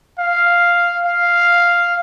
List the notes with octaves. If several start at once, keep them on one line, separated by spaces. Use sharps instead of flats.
F5
F5